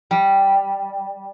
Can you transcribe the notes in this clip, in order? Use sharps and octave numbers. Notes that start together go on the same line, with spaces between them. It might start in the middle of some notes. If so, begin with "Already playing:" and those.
G3